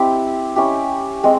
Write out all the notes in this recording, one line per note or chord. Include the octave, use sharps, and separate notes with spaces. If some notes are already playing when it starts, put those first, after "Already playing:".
Already playing: C4 E4 G4
C#4 E4 G4
G#3 C4